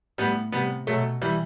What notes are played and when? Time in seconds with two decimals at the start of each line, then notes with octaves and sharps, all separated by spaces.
0.18 A2 G3 B3
0.52 C3 G3 B3
0.87 B2 F#3 A3
1.22 E3 G3